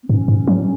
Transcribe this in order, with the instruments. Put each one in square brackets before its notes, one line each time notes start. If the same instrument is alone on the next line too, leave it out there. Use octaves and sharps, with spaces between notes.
[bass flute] B3
[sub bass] G#2 [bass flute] C#4
[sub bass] G#2
F#3